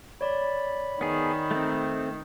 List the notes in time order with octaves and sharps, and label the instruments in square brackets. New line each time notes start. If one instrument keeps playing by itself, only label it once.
[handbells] C#5 D5 [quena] B5
[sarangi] D#3 [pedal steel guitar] B3 G#4
[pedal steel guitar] A3 C4